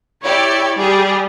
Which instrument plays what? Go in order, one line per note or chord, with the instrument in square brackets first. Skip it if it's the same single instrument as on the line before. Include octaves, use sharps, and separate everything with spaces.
[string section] E4 G4 D5 [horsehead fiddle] C#5
[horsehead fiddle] G3 [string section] G4 G#4